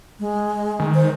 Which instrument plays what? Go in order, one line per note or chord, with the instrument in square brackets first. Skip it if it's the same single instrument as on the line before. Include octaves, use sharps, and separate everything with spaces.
[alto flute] G#3
[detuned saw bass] D#3
[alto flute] C5